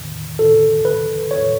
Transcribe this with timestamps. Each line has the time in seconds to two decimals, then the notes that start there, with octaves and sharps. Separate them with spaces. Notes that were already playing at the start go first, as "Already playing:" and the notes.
Already playing: E2 D#3
0.39 A4
0.85 B4
1.31 C#5